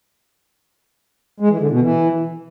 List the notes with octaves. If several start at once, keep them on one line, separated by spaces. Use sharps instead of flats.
G#3
E3
D3
B2
E3